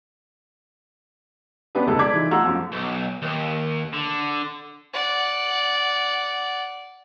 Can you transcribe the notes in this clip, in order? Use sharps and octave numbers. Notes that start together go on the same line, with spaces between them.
G#3 B3 C#4 D4 G4 B4
F1 C#2 G#4 A4
D5 D6 G#6 B6
E3 D#4 F4
A3 F4 F#5 A#5 E6
F#2 F3
B1
D#2
D3
D5 F#5